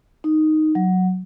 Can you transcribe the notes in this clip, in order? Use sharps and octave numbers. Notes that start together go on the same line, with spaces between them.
D#4
F#3